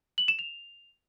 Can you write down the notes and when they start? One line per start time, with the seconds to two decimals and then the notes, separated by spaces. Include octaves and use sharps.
0.18 F#7
0.28 E7
0.39 F7